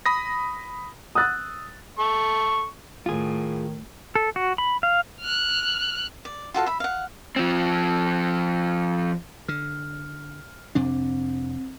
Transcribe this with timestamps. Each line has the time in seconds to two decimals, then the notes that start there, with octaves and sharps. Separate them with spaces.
0.06 B5 D#6 A#6
1.15 D#6 E6 F#6 A6
1.99 A4 C#6
3.06 A2 D#3 F4 G#4
4.15 A4
4.36 F#4
4.58 B5
4.83 F5
5.21 F6 F#6
6.25 D5
6.54 F4 F#4 A4 F5
6.66 E5 B5
6.80 F5 F#5
7.36 F3 C4
9.48 D3 F6
10.75 F2 C3 C4 D4